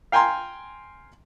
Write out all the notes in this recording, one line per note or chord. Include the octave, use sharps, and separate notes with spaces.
F5 G5 G#5 A#5 C6